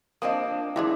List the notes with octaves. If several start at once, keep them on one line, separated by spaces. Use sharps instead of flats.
F3 A#3 C4 D4 D#5 D#6
G2 E3 C4 D4 E4 G#4